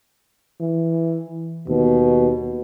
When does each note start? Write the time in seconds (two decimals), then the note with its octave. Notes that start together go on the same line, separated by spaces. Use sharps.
0.60 E3
1.68 D#2 B2